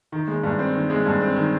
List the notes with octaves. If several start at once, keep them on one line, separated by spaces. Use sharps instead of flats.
D#3
G#3
G2
C4
D#3
G#3
G2
C4
D#3